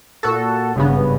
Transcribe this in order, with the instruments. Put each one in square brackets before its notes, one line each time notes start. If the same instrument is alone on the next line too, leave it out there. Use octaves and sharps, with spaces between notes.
[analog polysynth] A#2 F#4 A4
[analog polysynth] G#1 G2 B3 [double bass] C#3